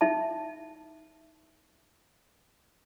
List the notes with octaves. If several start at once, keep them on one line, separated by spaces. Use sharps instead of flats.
D#4 E5 A5